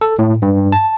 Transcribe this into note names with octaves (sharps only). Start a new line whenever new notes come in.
A4
A2
G2
A5